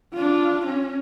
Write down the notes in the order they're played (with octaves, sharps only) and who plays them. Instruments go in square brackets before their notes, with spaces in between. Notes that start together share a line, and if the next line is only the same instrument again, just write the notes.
[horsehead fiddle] D4 F4
C#4